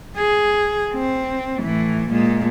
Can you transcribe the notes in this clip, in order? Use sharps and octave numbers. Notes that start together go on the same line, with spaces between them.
G#4
C4
A2 E3
A#2 G#3